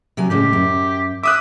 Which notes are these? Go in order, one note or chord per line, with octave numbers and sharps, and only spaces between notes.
C3 F#3 G#5
A2 C#3 G#3 G4
F#2
E5 D6 D#6 F#6